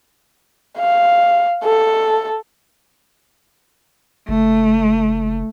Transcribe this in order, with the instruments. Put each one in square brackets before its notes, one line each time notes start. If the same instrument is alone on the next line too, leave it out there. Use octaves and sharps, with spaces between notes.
[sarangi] F5
A4
[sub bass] F#1 [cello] A3